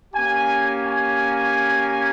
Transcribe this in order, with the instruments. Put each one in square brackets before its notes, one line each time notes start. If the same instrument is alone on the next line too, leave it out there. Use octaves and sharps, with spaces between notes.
[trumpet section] A#3 C#4 G4 G#5
G#5